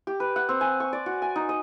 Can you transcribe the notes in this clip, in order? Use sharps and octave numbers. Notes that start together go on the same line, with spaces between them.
G4
B4
F#5
C4
G#5
C#6
D5
F#4
G#5
D#4
D#5